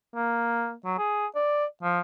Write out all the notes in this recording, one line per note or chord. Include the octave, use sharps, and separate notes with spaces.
A#3
F#3
G#4
D5
F3